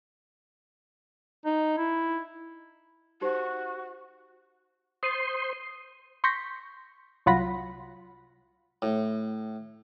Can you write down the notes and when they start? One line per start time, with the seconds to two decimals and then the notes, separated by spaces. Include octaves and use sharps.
1.45 D#4
1.78 E4
3.21 D#4 F#4 G4 C5
5.03 C5 C6 D#6 C7 D#7
6.24 C6 C#6 G6 A#6 B6
7.26 C2 F#3 F4 F#5 B5 A#6
8.82 A2